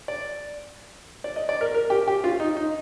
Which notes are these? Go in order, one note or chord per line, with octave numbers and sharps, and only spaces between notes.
D5
D5
D#5
D5
A#4
A#4
G4
G4
F4
D#4
D#4